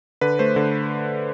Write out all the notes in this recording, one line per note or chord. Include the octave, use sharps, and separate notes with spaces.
D3 B4
A3 C5
D3